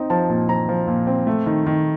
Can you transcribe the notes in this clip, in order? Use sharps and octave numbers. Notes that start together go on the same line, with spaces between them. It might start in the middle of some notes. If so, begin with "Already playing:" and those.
Already playing: C4 D#4
F3 A5
A#2
F3 A#5
F3
A#2
C4
A3
D#3
D#3